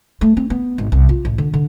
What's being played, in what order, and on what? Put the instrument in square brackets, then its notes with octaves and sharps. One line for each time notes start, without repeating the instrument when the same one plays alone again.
[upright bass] A3
C4
B3
G#1
C2
F4
A1
D3
D3